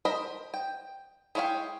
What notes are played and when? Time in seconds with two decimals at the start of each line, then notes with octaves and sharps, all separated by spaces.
0.05 A#4 C5 D#5 B5
0.54 G5
1.35 G#3 E4 C#5 F5 G5